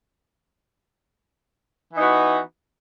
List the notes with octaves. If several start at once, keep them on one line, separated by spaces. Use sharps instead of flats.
E3 B3 D#4 F#4